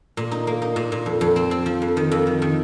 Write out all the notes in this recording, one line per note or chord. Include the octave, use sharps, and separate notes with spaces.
A#2
D#4
A#3
D#4
A#2
A#2
F2
F2
C4
C4
F3
F2
D#3
F2
D#3
D#3